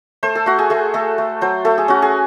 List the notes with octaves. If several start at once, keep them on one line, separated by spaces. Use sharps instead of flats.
A3 C5
A4
A3 F#4
G#4
A3 G#4
A3 A4
A3
F#3 C5
A3 A4
G#4
C#4 F#4
G#4